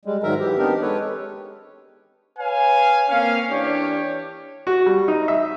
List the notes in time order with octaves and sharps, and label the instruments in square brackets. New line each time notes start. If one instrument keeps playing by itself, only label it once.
[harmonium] G3 G#3
G#2 D#3 F#3 A#4 E5 A#5
E3 G4
B3 C4 D4 D#4 G4 A#4
G#3 A4 B4 C#5
[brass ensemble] B4 C#5 F5 G#5
A#3 C4 C#4 F5
E3 D4 G4 C#5
[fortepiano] F#4
G3
D#4
E5